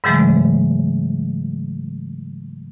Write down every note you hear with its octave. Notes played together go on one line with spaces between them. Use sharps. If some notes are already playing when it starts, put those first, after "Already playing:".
G#2 C#3 E3 F#3 G#3 A3